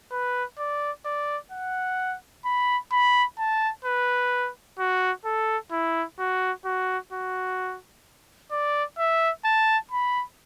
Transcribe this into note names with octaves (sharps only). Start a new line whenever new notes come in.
B4
D5
D5
F#5
B5
B5
A5
B4
F#4
A4
E4
F#4
F#4
F#4
D5
E5
A5
B5